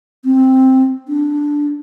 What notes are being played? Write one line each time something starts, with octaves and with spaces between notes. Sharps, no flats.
C4
D4